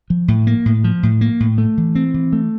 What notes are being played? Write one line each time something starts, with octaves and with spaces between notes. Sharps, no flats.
F3
A2
A#3
A2
F3
A2
A#3
A2
A3
E3
C4
E3
A3